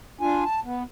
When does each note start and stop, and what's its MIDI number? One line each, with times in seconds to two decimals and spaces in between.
0.21 0.44 62
0.21 0.44 65
0.21 0.44 80
0.45 0.60 81
0.65 0.83 59